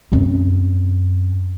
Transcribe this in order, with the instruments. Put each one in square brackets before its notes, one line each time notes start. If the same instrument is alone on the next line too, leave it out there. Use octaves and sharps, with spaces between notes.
[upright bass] F#2 C4